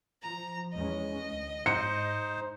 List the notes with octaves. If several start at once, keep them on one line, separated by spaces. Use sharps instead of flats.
F3 A#5
E2 G#3 C#4 D#5
D2
G#2 D#4 C5 C#7